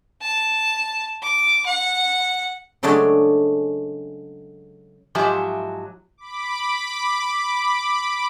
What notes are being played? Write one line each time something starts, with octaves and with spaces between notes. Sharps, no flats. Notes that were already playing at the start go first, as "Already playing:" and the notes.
A5
D6
F#5
C#3 F#3 G#3 A3 D4 G#4
G#2 F3 F#3 G4 E5 G#5
B5 D6